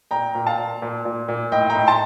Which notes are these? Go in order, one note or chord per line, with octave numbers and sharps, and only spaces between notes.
A#2 G5 A#5
A#2
F5 A5
A#2
A#2
A#2
A#2
A2 D#5 G5
G5 A#5
A2
A5 C6